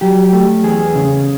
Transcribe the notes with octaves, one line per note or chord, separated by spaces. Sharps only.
F#3 G4
A3
E2 G#4
C#3